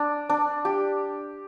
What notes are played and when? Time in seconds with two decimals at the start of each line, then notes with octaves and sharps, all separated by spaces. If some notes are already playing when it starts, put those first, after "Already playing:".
Already playing: D4
0.30 D4
0.65 G4